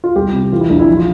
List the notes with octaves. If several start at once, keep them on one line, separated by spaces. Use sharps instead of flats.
F4
C2 G4
C3
E3 F4
E4
A#1 D4
E4
F3
F4